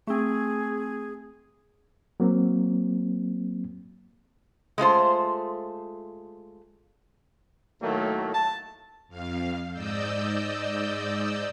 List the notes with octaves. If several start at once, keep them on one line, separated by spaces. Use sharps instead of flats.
A3 C4 G#4
F#3 A#3 C4
G#3 A3 F4 C5
A2 D#3 F#3 A3 A#3
A5
F2 F5
G#2 D5 D#5 E6 G6